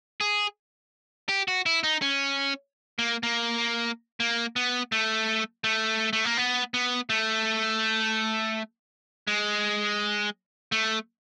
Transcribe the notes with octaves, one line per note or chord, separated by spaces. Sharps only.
G#4
G4
F#4
E4
D#4
C#4
A#3
A#3
A#3
B3
A3
A3
A3
A#3
B3
B3
A3
G#3
A3